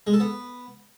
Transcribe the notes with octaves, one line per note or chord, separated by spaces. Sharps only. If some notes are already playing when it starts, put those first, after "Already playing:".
G#3
A4
B3